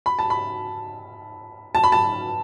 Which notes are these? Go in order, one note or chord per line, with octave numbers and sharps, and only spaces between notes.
B5
A5
B5
A5
B5
A5